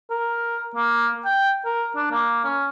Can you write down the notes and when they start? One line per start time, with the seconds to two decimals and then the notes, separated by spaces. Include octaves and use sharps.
0.10 A#4
0.76 A#3
1.25 G5
1.65 A#4
1.96 D4
2.11 A#3
2.44 C#4